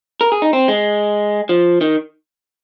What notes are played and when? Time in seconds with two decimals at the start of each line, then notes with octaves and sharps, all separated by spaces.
0.21 A#4
0.32 G#4
0.42 D#4
0.53 C4
0.68 G#3
1.49 F3
1.81 D#3